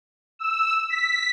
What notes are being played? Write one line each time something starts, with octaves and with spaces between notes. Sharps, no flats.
E6
B6